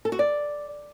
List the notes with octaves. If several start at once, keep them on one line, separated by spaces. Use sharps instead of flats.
A4
F#4
D5